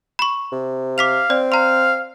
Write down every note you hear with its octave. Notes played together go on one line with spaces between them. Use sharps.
B5 C#6
C3
F5 D6 B6 F7
C4 D5
F5 A#5 C6